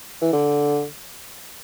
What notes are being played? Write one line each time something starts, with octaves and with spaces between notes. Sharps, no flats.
E3
D3